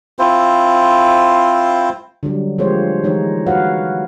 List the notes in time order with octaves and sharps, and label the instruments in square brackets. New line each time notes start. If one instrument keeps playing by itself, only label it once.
[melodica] C4 E4 F4 C5
[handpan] D3 F#3 G3
F3 G#3 A#3 G4 C5 C#5
E3 G#3 D#4 C#5
F#4 B4 C#5 F5 F#5